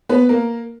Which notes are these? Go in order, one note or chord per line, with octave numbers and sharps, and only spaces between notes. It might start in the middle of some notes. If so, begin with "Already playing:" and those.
B3 B4
A#3 A#4